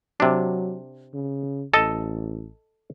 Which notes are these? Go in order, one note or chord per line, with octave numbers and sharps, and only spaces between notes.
C3 F#3 D4
C#3
A1 A4 D#5 A5